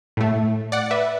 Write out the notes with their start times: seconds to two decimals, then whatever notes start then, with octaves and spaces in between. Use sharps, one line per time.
0.17 A2 A3
0.72 D5 F#5
0.91 B4 E5